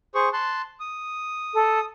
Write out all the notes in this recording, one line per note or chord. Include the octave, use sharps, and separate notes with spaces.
G#4 C5 C#6
A5 C6 F#6
D#6
A4